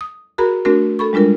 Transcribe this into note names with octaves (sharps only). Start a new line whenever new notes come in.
D#6
F#4 G#4 A#4 A#5 B5
A3 C4 D4 F#4 A#4
A4 B5 C#6
G3 G#3 D4 F4 A#4